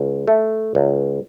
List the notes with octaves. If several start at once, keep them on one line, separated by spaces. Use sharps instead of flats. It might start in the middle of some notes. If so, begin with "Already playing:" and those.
Already playing: C#2
A3
C#2